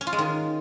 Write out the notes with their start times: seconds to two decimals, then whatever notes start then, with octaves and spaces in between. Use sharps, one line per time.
0.01 C#4
0.07 F4
0.13 G#3
0.18 D#3